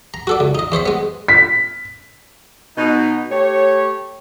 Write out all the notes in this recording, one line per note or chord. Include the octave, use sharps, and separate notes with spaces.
A#5
F#4 A4 D5
C#2
D#4 D#5
E2 C5 C#5 B5
G#3 B3
B6
B2 D#4
A3 G4 C#5